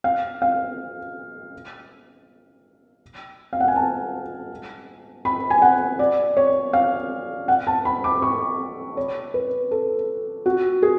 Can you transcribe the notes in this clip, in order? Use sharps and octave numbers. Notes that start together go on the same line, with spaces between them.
F5
F5
F5
F#5
G#5
A5
B5
G#5
F#5
D5
C#5
F5
F#5
A5
B5
D6
C#6
C#5
B4
A4
F#4
G#4